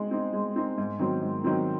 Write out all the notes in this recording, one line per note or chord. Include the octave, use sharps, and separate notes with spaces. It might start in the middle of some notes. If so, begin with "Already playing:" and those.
Already playing: G#3 C4 D#4
C4 D#4
G#3
C4 D#4
G#2
D#3 F#3 C4
G#2
D#3 F#3 C4